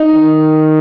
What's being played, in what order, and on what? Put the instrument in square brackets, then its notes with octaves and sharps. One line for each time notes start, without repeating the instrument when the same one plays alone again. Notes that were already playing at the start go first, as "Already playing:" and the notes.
Already playing: [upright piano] D#4
[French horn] D#3